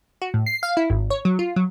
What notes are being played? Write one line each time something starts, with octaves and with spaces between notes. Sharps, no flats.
F#4
A2
C7
F5
E4
G#1
C#5
F#3
F4
F#3